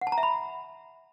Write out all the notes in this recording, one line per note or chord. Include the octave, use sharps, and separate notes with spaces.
F#5
A5
A#5
E5
B5